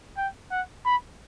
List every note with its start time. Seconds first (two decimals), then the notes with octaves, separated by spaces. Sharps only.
0.18 G5
0.51 F#5
0.86 B5